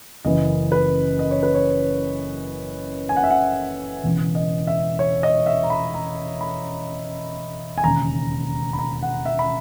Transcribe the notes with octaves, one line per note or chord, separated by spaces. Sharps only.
F#1 F#2 C#3 E3 D#5
B4
D#5
C#5
B4
C#5
G#5
F#5
E5
F#5
E1 E2 C#3 E3
D#5
E5
C#5
D#5
E5
A#5
B5
A#5
B5
G#5
E1 D#2 C#3 A#5
B5
A#5
F#5
E5
B5